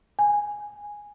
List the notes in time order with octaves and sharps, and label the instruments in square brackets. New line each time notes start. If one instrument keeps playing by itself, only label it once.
[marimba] G#5